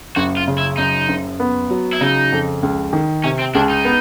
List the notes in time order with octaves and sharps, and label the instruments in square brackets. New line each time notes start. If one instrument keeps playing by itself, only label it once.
[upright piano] F#1 [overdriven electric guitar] F#4
[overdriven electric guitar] F4
[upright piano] C#3
[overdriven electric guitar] E4
[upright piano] F#2 [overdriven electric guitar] D#4
[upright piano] F#1
B3
F#3
[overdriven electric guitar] E4
[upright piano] C#3 [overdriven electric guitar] D#4
[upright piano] F2
C#2
D#3
[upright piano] C3 [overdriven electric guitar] C#4
[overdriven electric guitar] C4
[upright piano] C#2 [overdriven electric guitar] D4
[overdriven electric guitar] D#4
[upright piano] B3